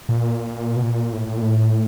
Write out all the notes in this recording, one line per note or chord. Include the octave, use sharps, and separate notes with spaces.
A#2
B2
A#2
A2
A2
A#2
A2